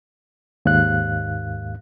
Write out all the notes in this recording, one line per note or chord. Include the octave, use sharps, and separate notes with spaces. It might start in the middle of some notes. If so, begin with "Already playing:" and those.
D#2 G#2 F5 F#6